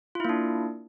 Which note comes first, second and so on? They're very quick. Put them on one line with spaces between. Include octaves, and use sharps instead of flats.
F4 E4 A#3 D4